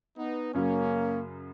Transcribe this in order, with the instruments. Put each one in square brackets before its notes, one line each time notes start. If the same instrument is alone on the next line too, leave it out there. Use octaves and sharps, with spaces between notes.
[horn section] B3 D#4
[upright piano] F#2 C#3 F#3 [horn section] A#3 C#4